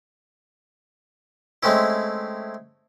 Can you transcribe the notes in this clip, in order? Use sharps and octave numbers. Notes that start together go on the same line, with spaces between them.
G#3 A3 C4 C#4 E4